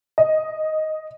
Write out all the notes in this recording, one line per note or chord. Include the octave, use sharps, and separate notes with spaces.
D#5